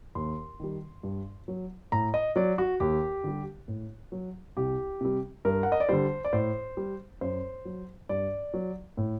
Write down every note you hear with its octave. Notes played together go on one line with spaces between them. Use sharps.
D#2 C6
D#3 G3
G2
F#3
A2 A#5
D#5
F#3 D5
F#4
D#2 G4
D3 G3
A2
F#3
C2 G4
C3 G3
G2 A#4
F#5
D#5
D5
D3 G3 C5
D5
A2 C5
G3
F#2 C5
F#3
G2 D5
F#3
A2